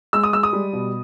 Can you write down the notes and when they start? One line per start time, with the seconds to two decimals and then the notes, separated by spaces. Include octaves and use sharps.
0.13 G#3 E6
0.23 D#6
0.33 G#3 E6
0.43 D#6
0.53 G3
0.73 B2